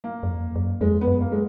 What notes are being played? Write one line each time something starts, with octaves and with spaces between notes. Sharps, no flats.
A#3
F#2
F2
F#2
F2 G#3
B3
F#2
A#3
G#3